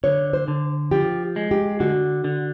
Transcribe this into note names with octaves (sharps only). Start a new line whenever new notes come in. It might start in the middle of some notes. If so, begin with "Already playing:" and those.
D3 C#5
C5
D3
F3 G4
G#3
G4
D3 F#4
D3